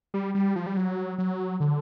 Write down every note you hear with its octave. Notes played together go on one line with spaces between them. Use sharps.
G3
G3
F3
G3
F#3
F#3
D3